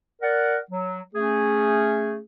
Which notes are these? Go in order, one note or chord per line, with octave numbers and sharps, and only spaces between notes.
A#4 D5 F#5
F#3
A3 C#4 G#4